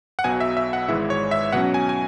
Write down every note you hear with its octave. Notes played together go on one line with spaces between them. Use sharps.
F#5
B1 B2 F#3 G#5
E5
E5
F#5
G#1 G#2 E3 G#3 E4 E5
C#5
E5
B2 F#3 C#4 F#5
G#5
G#5